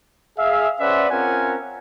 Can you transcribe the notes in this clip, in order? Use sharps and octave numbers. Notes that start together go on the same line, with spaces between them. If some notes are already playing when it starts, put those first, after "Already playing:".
G#4 E5 F5
C#4 B4 C5 D5 E5 F#5
C4 C#4 F4 A#4 F#5 G#5